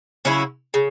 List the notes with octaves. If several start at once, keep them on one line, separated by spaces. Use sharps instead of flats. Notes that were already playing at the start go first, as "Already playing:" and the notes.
C#3 F#3 C#4 E4
C#3